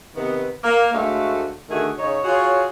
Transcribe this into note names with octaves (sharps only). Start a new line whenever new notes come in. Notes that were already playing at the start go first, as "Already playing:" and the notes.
C3 D#3 B3
A#3
D2 G#3 A3 F#4 F5
D3 D#3 A3 F#4 G#4
C#3 D#4 C#5
F4 F#4 G#4 C#5